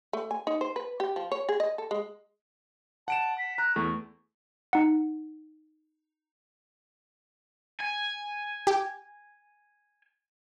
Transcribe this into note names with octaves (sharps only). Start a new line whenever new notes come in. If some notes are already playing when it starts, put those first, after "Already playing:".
A3
G#5
D#4
C5
B4
G4
F3
C#5
G#4
D#5
A4
G#3
F#5 A5 D7 E7
B6
A#5 F#6
E2 A3 C#6
D#4 F#5
G#5
G4